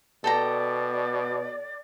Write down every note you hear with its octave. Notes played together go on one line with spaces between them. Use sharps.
B2 A4 D5 G5 A#5